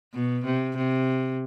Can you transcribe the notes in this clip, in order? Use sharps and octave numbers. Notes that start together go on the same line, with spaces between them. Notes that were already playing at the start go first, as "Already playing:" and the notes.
B2
C3
C3